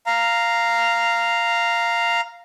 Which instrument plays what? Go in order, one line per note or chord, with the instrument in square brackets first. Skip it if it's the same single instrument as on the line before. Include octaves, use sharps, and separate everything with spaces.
[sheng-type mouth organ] F5 A#5